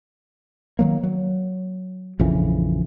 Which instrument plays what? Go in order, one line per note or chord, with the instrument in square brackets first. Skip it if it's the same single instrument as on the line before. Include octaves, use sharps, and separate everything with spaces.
[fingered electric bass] D#3 F#3 A#3
F#3
A#1 F2 C#3 E3